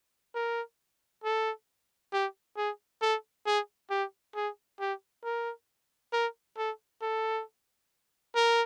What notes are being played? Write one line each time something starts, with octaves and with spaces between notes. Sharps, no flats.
A#4
A4
G4
G#4
A4
G#4
G4
G#4
G4
A#4
A#4
A4
A4
A#4